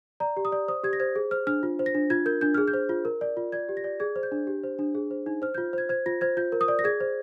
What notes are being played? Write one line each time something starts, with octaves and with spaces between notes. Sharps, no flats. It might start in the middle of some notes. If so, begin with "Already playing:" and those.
D5 A#5
G4
D#6
D5
C5 D#6
G4 G#6
A#6
C5 G#6
G#4
C5 F6
D4 F6
F4
C5
A#6
D4
F4 G#6
A#4 G6
D4 G6
G#4 F6
G6
C5
F4
A#4
D5
F4
D5 G#6
G4
A#6
D5
G#4 G#6
C5
G6
D4
G4
C5
D4
G#4
C5
D#4
C5 F6
G6
F4
C5 G#6
C5 G#6
F4 A#6
C5 G#6
F4 G6
A#4
D#6
D5
A#6
G#4 G#6
C5